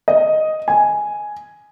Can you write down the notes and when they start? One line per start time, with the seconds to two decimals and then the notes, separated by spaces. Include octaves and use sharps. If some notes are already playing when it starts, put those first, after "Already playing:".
0.08 D#5
0.68 G#5